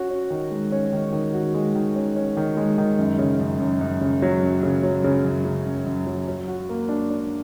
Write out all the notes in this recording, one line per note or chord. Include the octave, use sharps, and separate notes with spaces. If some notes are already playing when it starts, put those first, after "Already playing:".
Already playing: C#4 F#4
C#4
D#3
G#3
C#4
D#3
D#3
F#4
G#3
D#3
C#4
C#4
D#3
G#3
D#3
F#2
C#3
F#2
F#2
F#2
C#3
F#3
F#2
C#3
F#3
C#3
F#2
C#3
F#2
F#2
F#3
F#3
F#4
A#3
D4
D4